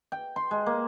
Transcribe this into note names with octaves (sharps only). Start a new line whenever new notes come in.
G5
C6
G#3
A#3